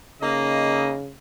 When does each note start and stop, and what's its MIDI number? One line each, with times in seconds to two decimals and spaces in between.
0.21 1.14 49
0.21 0.92 58
0.21 0.92 63
0.21 0.92 75